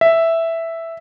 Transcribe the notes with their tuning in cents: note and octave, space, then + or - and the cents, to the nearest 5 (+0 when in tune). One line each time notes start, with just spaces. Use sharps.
E5 +0